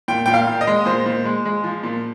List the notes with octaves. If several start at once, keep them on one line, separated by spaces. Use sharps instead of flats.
A#2 G5
A#2 G5
F5
A#2
D#5
G#3
A#2 C5
A#2
G#3
G#3
F3
A#2